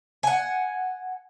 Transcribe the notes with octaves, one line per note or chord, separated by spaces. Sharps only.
F#5 G#5